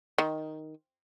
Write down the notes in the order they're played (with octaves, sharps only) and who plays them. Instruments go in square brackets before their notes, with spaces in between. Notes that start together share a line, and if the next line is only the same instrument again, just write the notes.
[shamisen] D#3